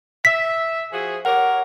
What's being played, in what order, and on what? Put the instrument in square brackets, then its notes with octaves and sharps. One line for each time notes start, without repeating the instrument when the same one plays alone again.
[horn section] E5 [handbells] B6
[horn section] F3 F#4 G#4
[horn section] G4 A#4 C#5 [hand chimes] F#5